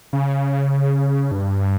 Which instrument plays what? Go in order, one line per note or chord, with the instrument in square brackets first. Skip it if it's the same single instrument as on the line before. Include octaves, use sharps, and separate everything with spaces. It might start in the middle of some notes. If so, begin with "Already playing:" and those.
[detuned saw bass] C#3
G2